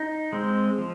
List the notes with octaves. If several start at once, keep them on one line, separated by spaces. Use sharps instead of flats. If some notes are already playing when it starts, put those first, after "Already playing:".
Already playing: D#4
G#3 C4
F3